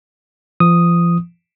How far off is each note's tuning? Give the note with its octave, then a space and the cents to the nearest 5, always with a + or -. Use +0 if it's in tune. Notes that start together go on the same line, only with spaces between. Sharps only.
F3 -35 D#6 +0